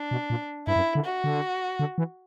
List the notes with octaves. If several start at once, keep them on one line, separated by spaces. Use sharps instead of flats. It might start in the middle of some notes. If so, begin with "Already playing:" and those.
Already playing: D4
B2
A#2
G2 E4
F#2
D3
F#4
D3
D3
E3